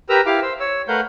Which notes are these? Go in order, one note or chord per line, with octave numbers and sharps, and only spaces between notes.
G4 A#4 B4 A#5 E6
E4 G4 F5 D6
C5 E6
C#5 E6
A3 A#4 B4 F5 F#5 G6